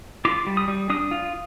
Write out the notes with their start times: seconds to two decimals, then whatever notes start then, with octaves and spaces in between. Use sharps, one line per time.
0.25 F4 D6
0.47 G3
0.57 D#6
0.68 G3
0.90 D4 D#6
1.11 F4